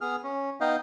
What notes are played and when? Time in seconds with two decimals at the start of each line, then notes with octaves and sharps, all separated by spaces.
0.01 B3 G#4 F6
0.23 C#4
0.60 B3 D#4 D#5 F5 G5